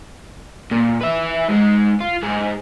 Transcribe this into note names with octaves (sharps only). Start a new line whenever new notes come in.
A#2
B4 E5
G#2 G#3
F4
G#2 G#4